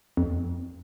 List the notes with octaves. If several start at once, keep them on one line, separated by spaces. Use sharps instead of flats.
F2